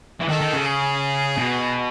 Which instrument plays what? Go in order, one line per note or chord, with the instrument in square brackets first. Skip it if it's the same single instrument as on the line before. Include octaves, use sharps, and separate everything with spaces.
[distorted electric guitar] E3
[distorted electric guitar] D#3 [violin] A4
[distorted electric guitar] D#3
C#3
[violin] G#4
[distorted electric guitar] B2